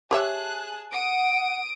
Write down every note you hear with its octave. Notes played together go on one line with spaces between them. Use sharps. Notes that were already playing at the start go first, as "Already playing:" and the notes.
G4 G#4 C#5 E5 A5 F#6
F#5 D#6 D7